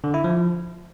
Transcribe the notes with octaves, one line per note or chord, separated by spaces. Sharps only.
D3
E4
F3